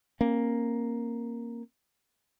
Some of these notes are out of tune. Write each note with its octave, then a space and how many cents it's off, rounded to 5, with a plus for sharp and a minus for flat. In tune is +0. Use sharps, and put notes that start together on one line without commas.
A#3 +0 C#4 -40